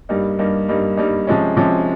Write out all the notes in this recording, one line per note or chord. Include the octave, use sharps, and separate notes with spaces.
G2 G3 A#3 D#4
G2 G3 A#3 D#4
G2 G3 A#3 D#4
G2 G3 A#3 D#4
C3 F3 G#3 C#4
C3 F3 G#3 C#4